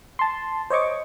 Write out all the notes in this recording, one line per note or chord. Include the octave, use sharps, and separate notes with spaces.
A5 C6
C5 C#5 D#5 C#6 D6